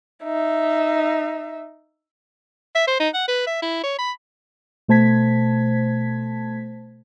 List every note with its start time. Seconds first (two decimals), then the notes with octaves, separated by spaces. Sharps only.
0.24 D#4 E5
2.75 E5
2.87 C5
3.00 D#4
3.14 F#5
3.28 B4
3.47 E5
3.62 E4
3.84 C#5
3.99 B5
4.88 B2 A3 C5 A5 G#6 B6